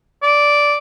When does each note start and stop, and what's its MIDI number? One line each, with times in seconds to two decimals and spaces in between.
0.23 0.77 74